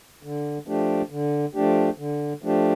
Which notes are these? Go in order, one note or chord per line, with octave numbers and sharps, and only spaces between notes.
D3
F3 A3 D4 G4
D3
F3 A3 D4 G4
D3
F3 A3 D4 G4